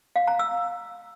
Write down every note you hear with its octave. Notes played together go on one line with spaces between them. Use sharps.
F5
A#5
E6